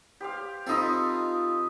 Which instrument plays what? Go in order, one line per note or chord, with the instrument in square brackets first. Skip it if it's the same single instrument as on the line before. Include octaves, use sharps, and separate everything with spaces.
[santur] G4 C5 F5
[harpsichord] C4 D#4 [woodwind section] F4 [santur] A4 D#5 B5